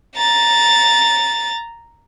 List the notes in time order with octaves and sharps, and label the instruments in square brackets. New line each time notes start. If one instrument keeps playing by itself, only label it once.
[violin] A#5 A6